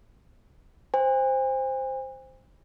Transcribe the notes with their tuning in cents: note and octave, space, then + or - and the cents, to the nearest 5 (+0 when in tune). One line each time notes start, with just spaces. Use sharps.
C5 +0 G#5 -45